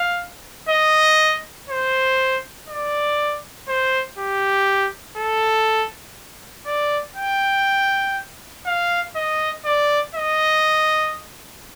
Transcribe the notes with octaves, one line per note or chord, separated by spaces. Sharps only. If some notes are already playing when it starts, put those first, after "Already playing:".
Already playing: F5
D#5
C5
D5
C5
G4
A4
D5
G5
F5
D#5
D5
D#5